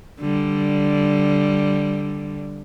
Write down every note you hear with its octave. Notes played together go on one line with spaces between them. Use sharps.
D3 G3